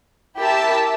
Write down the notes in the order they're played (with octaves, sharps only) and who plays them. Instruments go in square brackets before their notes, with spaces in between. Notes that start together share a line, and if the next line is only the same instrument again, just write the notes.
[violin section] E4 G4 A#4 E5 A5